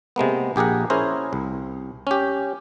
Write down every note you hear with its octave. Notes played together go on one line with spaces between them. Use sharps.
C3 G#3 A#3 B3
A#1 G4 G#4 A#4 F#5
C#4 E4 G#4 A#4 C5
C2
C#4 G4